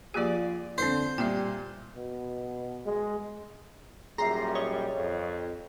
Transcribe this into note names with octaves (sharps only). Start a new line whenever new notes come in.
F3 A#3 F4 G4 G#4 D5
D3 C4 E4 C5
A#2 G3 E5 G5
B2
G#3
F#2 A#2 G3 G#4 E5 A#5 C6
C#5 D#5
F2